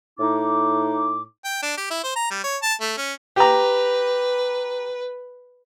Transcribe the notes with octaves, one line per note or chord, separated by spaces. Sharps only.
A2 D#4 D6
G5
D4
G4
E4
C5
A#5
G3
C#5
A5
A3
C#4
G4 B4 A#5